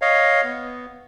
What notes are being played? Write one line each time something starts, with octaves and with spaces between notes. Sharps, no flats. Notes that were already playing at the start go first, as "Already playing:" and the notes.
C#5 D#5 F5
B3